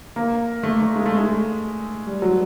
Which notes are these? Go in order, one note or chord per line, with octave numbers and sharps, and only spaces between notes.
A#3
A3
A3
G#3
A3
G#3
G3
F#3